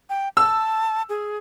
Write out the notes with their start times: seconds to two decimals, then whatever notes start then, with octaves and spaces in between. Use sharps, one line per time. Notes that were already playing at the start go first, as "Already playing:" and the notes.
0.10 G5
0.37 A5 E6
1.09 G#4